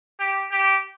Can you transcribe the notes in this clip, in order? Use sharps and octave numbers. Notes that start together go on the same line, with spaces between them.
G4
G4